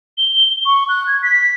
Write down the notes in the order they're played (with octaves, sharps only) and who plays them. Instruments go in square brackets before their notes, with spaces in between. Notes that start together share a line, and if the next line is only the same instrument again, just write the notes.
[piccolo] G7
C#6
F#6
G#6
B6